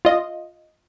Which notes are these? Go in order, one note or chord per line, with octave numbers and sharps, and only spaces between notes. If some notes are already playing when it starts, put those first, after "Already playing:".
F4 D#5